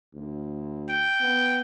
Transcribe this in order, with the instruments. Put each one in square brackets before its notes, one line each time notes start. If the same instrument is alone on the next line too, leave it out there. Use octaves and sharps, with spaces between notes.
[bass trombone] D2
[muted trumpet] G5
[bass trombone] B3